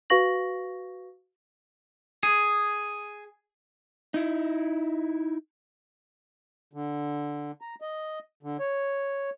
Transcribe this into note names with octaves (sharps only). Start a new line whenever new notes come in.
F#4 B4 F5 C#6 A#6 F#7
G#4
D#4 E4
D3
A#5
D#5
D3
C#5